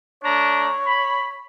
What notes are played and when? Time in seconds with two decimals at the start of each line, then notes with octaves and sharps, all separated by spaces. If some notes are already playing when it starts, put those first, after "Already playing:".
0.24 A3 D4 C#5 A#5
0.85 B5